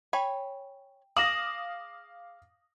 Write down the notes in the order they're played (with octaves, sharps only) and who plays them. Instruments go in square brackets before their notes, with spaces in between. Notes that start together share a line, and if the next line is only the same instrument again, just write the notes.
[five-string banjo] C#5 G#5 B5 [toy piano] G5
[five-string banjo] G#4 [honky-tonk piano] F5 D6 D#6 [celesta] A#6 E7 F#7